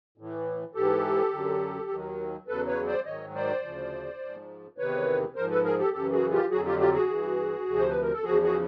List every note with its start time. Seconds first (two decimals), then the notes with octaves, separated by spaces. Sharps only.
0.18 A2 E3
0.75 G#2 E3 G4 A4
1.32 F#2 D3 F#3
1.90 D#2 D#3 F#3
2.47 E2 C#3 F#3 A4 B4
2.67 B4 C#5
2.87 C5 D5
3.05 G#2 D#3 F#3 C#5 D#5
3.35 C5 D5
3.63 D2 C#3 F3
4.21 G#2 F3
4.78 E2 C3 D#3 B4 C#5
5.36 G#2 F3 A#4 C5
5.50 A4 B4
5.64 G#4 A#4
5.79 G4 A4
5.93 F#2 C#3 E3 G4 A4
6.12 F#4 G#4
6.32 F4 G4
6.51 F2 D3 F#3 F#4 G#4
6.66 F4 G4
6.79 F4 G4
6.94 F#4 G#4
7.09 G2 E3
7.66 D2 C3 F3
7.79 C5
7.89 B4
8.01 A#4
8.13 A4
8.24 E2 C#3 F3 F#4 G#4
8.43 F#4 G#4